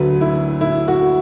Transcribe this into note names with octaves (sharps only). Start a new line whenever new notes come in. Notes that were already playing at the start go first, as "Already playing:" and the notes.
Already playing: D2 D3 F#3 B4
E4
E4
F#4